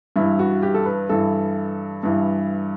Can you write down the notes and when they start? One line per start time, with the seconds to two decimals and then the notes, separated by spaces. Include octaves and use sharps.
0.16 G2 E3 E4
0.39 F#4
0.63 G4
0.74 A4
0.86 B4
1.09 G2 E3 A4
2.03 G2 E3